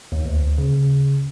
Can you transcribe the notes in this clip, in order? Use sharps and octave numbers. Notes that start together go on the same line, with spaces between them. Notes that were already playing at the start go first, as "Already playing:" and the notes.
D#2
D2
C#3